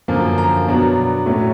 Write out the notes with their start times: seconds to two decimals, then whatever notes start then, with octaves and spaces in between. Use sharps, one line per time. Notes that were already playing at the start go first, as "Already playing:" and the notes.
0.08 F#2 D3 F3 A#3
0.38 A#5
0.67 B2 F#3 B3 D4
1.26 A2 F#3 A3 C#4